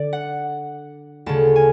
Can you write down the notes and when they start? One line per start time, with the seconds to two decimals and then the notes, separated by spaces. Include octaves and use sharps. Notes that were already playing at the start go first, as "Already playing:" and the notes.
Already playing: D3 D5
0.13 F#5
1.26 D2 C#3 A5
1.56 G#5